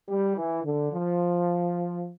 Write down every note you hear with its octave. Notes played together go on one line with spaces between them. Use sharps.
G3
E3
D3
F3